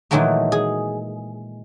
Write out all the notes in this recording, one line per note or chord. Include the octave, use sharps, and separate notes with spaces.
A#2 D#3 E3 F#3 G#3 A3
G#4